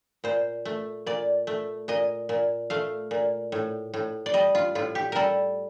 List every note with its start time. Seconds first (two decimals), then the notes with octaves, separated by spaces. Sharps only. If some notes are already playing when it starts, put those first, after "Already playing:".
0.24 A#2 C5
0.65 A3
1.06 A#2 D5
1.47 A3
1.88 A#2 D#5
2.29 A#2
2.70 A3 F5
3.11 A#2
3.52 A2
3.94 A2
4.26 D5
4.34 G3 D#5
4.55 F4
4.75 A2 F4
4.95 G4
5.12 G3 A4 A#4